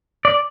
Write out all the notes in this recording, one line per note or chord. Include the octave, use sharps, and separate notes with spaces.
D5